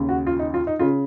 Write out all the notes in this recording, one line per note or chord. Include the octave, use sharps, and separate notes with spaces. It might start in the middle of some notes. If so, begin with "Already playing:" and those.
Already playing: D#2 C#3
F#4
F4
D#4
F4
D#4
C#3 F4